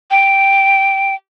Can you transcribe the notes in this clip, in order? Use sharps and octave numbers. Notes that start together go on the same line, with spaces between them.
G5